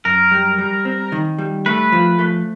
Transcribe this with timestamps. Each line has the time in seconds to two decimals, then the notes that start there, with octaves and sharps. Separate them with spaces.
0.05 F#2 A#4
0.31 G3
0.58 G3
0.85 C4
1.12 D#3
1.38 G3
1.66 A3 B4
1.92 F3
2.19 A3